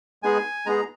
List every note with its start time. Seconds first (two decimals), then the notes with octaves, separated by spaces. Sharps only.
0.23 G#3 B3 D#4 G#4 G#5
0.66 G#3 B3 D#4 G#4 A#5